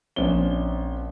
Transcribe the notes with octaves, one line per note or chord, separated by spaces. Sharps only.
A#1 C4 C#4 G7